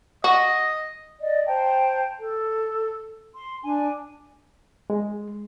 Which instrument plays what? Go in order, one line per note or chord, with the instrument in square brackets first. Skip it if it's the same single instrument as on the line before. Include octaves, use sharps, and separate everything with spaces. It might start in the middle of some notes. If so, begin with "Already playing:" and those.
[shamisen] F#4 [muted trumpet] D#5
[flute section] D5 D#5
C5 G5 A5 A#5
A4
C6
D4 G#5
[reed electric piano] G#3